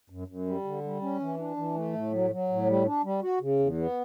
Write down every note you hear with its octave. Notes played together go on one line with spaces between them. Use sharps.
F#2
F#2
G3
D3
G3
C#4
E3
D4
E3
A3
A2
F#3
F#3
A2
G3
D4
G3
F#4
C#3
E2
B3